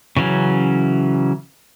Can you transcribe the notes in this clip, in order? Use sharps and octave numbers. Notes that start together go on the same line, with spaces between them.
C#3 E3 F#3 C#4